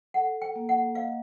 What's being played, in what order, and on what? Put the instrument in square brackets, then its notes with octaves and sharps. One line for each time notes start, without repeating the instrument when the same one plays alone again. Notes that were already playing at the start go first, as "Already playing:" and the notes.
[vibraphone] A4 [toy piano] F#5
[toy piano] G5
[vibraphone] A#3
[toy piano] F#5
[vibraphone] D#5 [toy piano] F5